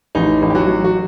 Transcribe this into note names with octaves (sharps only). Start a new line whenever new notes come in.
A1 D#4
A1
G4
F#3 F#4
F#3
F#4